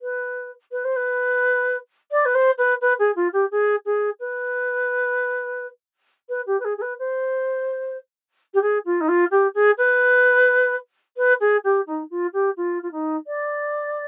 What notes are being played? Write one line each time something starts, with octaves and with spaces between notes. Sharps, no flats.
B4
B4
C5
B4
D5
B4
C5
B4
B4
G#4
F4
G4
G#4
G#4
B4
B4
G4
B4
G#4
G#4
B4
C5
G4
G#4
F4
D#4
F4
G4
G#4
B4
B4
G#4
G4
D#4
F4
G4
F4
F4
D#4
D5